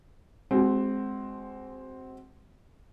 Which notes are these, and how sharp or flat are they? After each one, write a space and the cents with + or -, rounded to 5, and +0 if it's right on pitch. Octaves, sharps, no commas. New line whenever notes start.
G#3 +0 C4 +0 F#4 +30